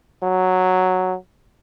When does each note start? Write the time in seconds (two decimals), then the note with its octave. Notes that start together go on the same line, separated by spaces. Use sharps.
0.23 F#3